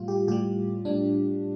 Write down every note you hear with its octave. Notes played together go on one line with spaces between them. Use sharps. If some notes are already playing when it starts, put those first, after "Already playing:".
Already playing: A2 G3 F4
G4
A2 G3 G4
A2 G3 D4